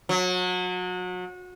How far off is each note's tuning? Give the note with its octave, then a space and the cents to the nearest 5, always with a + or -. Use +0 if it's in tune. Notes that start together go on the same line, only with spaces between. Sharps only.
F#3 -30